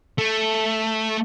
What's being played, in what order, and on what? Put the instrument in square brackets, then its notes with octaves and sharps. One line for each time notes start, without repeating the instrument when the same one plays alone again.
[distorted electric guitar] A3